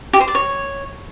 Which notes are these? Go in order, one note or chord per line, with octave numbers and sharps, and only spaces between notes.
G4
C5
D5
C#5